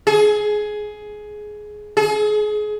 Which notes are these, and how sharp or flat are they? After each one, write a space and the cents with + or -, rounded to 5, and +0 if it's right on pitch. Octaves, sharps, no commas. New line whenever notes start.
G#4 +15
G#4 +25